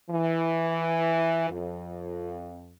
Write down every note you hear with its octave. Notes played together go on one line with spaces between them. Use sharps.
E3
F2